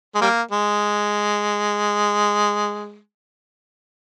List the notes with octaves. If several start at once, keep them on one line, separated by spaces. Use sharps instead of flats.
G#3
G3 A#3
G#3